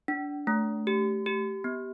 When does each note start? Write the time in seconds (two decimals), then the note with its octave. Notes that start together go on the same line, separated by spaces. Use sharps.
0.08 D4
0.47 A3
0.87 G4
1.26 G4
1.64 B3